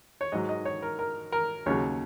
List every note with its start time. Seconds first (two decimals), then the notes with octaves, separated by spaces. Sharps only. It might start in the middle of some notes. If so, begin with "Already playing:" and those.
0.21 C#5
0.32 G#2 F#3 D#5
0.49 D#5
0.65 C#5
0.82 A#4
0.99 A#4
1.32 A#4
1.66 D#2 C#3 F#3 C#5